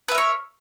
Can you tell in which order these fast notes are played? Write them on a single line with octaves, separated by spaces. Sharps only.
B4 E5 A#4 C#5